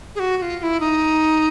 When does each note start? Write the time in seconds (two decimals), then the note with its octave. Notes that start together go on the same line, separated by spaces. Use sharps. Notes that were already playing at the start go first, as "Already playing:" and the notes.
0.15 G#4
0.20 F#4
0.37 F#4
0.42 F4
0.59 F4
0.63 E4
0.80 D#4